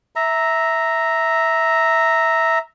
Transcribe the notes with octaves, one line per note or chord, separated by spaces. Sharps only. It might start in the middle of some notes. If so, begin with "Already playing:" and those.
E5 A#5